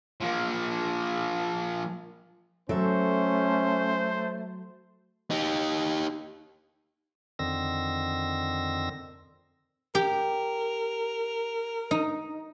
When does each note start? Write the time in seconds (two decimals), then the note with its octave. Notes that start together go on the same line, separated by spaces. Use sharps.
0.21 F3 A#3
2.69 F#3 A3 C#4 A4 C5 E5
5.31 D#4 G4
7.39 F2 D3 D#3 C4 E6 A#6
9.95 G4 A#4
11.91 D#4